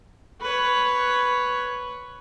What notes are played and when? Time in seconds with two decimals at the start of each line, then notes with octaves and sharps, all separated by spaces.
0.42 B4 C#5